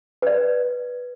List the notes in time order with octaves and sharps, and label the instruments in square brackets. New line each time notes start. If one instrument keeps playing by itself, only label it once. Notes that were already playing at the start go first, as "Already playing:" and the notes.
[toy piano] B4 D5